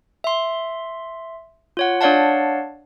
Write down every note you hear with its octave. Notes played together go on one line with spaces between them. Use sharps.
E5 C6
F4 C#5 F#5
D4 C#5 D5 F5 F#5 A5